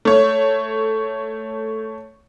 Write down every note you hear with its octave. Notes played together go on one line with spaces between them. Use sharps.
A3 C#5